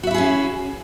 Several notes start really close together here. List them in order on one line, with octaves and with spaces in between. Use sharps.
F#4 E5 E4 G#4 C#4